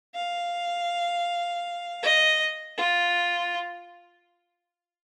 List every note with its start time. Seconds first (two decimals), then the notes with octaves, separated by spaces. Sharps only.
0.15 F5
2.02 D#5
2.77 F4